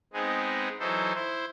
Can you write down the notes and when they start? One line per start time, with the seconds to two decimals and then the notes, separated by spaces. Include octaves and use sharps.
0.13 G#3 B3 C4 D#4 G#4
0.79 E3 F#3 D#4 A4 C5
1.15 E4 C5